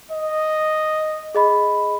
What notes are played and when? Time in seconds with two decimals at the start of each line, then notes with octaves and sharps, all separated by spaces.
0.12 D#5
1.35 G#4 D#5 B5